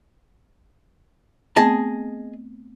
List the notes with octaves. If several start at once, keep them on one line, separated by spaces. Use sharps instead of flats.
A3 B3 C4 G#4 D#5 A5